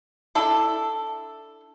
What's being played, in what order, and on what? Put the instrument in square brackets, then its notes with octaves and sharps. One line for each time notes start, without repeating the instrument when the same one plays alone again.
[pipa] D4 E4 A4